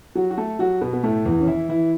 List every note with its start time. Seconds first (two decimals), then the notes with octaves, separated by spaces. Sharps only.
0.15 F#3 F#4
0.31 F#4
0.38 A3 A4
0.59 F#3 F#4
0.81 B2 B3
0.93 B3
1.03 A2 A3
1.25 E2 E3
1.41 C#4
1.47 E3 E4
1.69 E3 E4